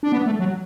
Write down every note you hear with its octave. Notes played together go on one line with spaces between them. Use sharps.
D4
B3
A3
F#3